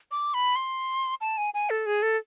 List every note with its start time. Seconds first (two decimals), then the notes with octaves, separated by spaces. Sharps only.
0.11 D6
0.34 B5
0.56 C6
1.21 A5
1.38 G#5
1.54 G#5
1.70 A4
1.86 G#4
2.02 A4